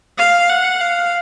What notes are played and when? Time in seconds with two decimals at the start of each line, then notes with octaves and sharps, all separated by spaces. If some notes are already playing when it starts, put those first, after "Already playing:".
0.18 F5
0.50 F#5
0.81 F5